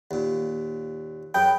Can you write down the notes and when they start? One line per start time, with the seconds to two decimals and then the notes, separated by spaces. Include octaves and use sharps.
0.11 D#2 A#2
1.34 F#2 G#4 B4 G5